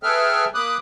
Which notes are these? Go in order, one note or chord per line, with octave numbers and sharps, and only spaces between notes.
G#4 A4 B4 E5 G5 F6
A#3 B5 D6 D#6 F#6